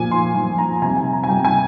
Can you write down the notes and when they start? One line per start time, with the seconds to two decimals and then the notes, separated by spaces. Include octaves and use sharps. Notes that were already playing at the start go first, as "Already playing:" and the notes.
Already playing: A#2 F3 G#5
0.11 C6
0.35 A#2 F3 C6
0.58 A#5
0.82 C3 G3 G#5
0.97 G#5
1.13 A#5
1.24 G#5
1.28 C3 G3 G5
1.45 G#5